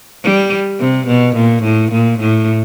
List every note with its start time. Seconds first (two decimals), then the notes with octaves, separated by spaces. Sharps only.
0.24 G3
0.80 C3
1.08 B2
1.36 A#2
1.63 A2
1.92 A#2
2.20 A2